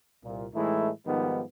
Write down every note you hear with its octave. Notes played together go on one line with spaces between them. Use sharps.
C2 A#2
A2 E3 G#3 A3 D#4 E4
G#2 D#3 F3 G3 B3